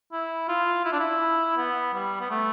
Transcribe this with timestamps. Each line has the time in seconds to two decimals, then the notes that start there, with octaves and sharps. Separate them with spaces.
0.12 E4
0.49 F4
0.85 E4
0.92 D4
1.00 E4
1.57 B3
1.93 G3
2.20 B3
2.30 A3